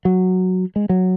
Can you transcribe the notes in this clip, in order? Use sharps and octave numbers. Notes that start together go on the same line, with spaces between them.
F#3
G#3
F#3